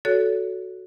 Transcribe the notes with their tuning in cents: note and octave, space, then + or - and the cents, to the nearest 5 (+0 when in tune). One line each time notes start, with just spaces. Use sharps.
F#4 +0 A4 -10 C#5 +30